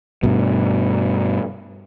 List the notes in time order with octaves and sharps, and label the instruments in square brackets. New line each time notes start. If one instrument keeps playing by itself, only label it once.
[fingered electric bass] G2 B2